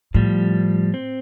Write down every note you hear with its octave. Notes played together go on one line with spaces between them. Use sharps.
A2 F3 G3
C4